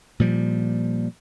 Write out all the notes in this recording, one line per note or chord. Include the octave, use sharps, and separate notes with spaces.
A#2 F3 G3